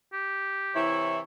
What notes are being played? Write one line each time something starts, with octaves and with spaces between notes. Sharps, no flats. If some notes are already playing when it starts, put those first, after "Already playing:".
G4
C3 E3 E4 C#5